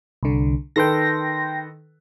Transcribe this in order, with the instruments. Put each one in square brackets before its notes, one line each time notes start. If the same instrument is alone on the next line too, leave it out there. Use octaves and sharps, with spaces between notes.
[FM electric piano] C2 D3
[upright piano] D#3 A4 B4 [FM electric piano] G5 C6 A#6